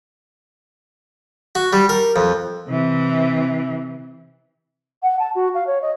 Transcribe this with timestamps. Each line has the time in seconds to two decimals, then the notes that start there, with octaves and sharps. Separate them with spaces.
1.55 F#4
1.73 G3
1.89 A#4
2.16 F2
2.68 C3 E3
5.03 F#5
5.19 A5
5.35 F#4
5.54 F5
5.67 C#5
5.82 D#5